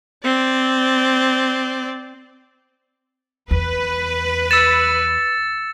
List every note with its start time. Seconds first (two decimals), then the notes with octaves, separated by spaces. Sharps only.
0.25 C4 D5
3.51 E2 B4
4.51 E6 A6 C#7 E7